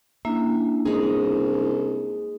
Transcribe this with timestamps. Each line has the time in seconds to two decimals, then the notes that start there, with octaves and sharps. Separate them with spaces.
0.25 A#3 C#4 D4 E4 E5
0.85 C2 G#3 D#4 G#4